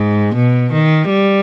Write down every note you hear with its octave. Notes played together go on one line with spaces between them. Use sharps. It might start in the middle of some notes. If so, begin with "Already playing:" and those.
Already playing: G#2
B2
D#3
G3